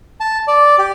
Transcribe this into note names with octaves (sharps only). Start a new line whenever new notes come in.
A5
D5
G4